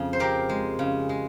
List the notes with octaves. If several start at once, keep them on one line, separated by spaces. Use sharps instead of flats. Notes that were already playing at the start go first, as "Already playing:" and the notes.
Already playing: F2 C#3
C5
C4 G4 A#4
G#3
C#3
G#3